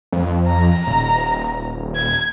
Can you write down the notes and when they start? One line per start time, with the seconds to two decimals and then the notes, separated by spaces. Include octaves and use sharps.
0.12 F2
0.47 A#5
0.87 D#1
1.96 G#6